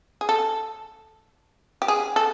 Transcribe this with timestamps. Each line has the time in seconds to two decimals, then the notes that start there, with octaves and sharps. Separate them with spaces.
0.21 G#4
0.29 A4
1.82 G4
1.88 G#4
2.16 A4